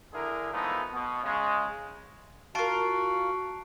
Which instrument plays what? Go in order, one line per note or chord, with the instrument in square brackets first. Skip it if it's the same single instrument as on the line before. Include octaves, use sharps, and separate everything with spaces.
[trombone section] D3 E4 G#4 A#4
E3 F3 G#3 A3 B3 D#4
B2
C#3 G#3
[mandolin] F4 A#4 [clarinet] F#4 [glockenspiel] A5 C7 D7